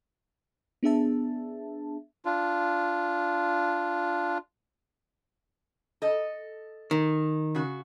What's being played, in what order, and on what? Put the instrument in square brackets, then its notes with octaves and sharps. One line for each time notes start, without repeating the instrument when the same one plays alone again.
[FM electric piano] B3 D4 G#4 E5 A5
[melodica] D4 F4
[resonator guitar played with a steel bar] A4 D#5
[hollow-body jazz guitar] D#3
[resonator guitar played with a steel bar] C#3 F#4